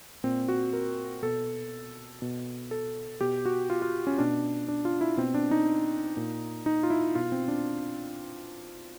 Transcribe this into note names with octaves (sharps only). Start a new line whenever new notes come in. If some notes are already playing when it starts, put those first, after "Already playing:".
A#2 C4
F#4
A#4
B2 A4
B2
A4
B2 G4
F#4
F4
F4
C#4
B2 D4
D4
F4
E4
B2 C4
D4
D#4
A#2
D#4
F4
E4
B2 F4
C4
D4